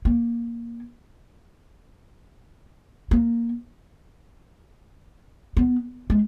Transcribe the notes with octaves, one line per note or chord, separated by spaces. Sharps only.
A#3
A#3
B3
G#3